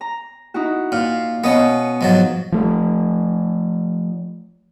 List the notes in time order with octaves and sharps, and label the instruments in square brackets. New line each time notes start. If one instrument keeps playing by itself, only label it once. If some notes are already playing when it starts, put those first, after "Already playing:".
[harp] A#5
D#4 E4 F#4
[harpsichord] A#2 [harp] F5
[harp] B2 D#5 [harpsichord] B3 C#4
[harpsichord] G#2 F3 F#3
[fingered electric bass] F3 A3